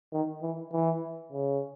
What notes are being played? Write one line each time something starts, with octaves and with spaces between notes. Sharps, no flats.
D#3
E3
E3
C#3